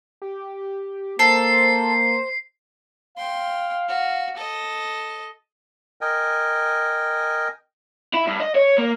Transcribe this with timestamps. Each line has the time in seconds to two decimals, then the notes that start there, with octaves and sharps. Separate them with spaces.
0.22 G4
1.19 A#3 A4 C5 C7
3.18 F5 G5 C6
3.89 F#4
4.37 A4 D#5
6.01 A#4 D#5 G5 G#5
8.14 E4
8.27 G2
8.40 D#5
8.55 C#5
8.78 A#3